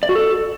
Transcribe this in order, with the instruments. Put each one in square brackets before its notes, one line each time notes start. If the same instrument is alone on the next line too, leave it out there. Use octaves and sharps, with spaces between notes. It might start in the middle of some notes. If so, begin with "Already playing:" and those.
[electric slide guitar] D5
F#4
A4